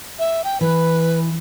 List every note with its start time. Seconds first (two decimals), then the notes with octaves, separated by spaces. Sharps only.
0.19 E5
0.44 G5
0.61 E3 B4